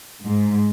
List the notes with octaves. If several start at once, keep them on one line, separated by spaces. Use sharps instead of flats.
G#2